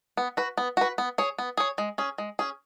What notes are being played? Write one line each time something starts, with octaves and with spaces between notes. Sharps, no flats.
B3
F#4 B4
B3
F#4 B4
B3
G#4 C#5
B3
G#4 C#5
G#3
C#4 G#4
G#3
C#4 G#4